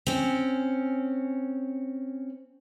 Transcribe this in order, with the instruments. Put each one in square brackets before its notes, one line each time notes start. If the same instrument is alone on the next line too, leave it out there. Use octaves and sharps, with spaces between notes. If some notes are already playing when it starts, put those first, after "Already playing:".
[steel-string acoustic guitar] C4 C#4